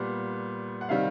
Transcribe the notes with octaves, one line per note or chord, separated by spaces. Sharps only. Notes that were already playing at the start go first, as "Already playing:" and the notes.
Already playing: A#2 G3 B3 F#5
F#5
C3 D#3 G3 F5